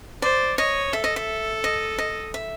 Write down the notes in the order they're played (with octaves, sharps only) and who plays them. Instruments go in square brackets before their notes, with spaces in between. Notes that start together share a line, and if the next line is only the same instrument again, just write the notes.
[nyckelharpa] C5 [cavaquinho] D5
[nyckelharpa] C#5 [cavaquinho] D#5
[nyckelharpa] A4 [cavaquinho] E5
[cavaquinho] D#5
E5
D#5
D#5
E5